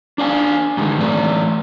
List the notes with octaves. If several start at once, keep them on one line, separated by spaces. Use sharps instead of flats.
D4 D5 F5 G#5
G2 D3 D#3 G#3
A2 E3 A3 D5